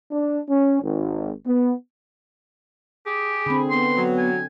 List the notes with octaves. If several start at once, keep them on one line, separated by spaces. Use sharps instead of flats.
D4
C#4
G#1
B3
G4 G#4
D3 C4 B5
B3 C6
F#3
G#5